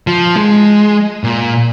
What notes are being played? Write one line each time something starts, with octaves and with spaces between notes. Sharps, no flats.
F3
G#3
A#2